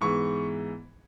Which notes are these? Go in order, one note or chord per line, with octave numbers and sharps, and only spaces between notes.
G#2 E3 G#3 B3 C#6